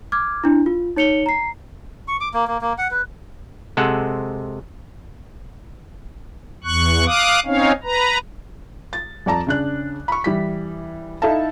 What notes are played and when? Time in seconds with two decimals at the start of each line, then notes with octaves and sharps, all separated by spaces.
0.12 D6 F6 G#6
0.44 D4 E4
0.66 F4
0.96 D#4 C#5 C#7 F7 G7
1.26 A#5 C7
2.08 C#6
2.21 D6
2.34 A#3
2.48 A#3
2.61 A#3
2.78 F#5
2.91 B4
3.77 C3 G#3 A4 C5 F#5
6.64 E2 C#6 F#6
7.06 F5 D6 D#6 F#6
7.46 C4 C#4 D#4 C#5 F5
7.83 B4 A#5
8.93 A6
9.26 F2 D5 A5 A#5
9.47 C#3 D4 F#6
10.08 B5 C#6
10.24 E3 G3 B6
11.22 D#4 E4 A4 E5 F5 A5